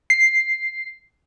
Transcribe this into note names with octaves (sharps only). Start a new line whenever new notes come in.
C7